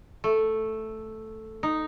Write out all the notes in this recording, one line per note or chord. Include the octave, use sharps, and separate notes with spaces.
A3
D#4